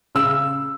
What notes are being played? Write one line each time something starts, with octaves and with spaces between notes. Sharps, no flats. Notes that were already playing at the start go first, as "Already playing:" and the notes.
C#3 E6